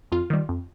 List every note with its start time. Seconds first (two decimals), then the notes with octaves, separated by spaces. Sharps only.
0.12 F2 F4
0.30 D#3 G3
0.49 F2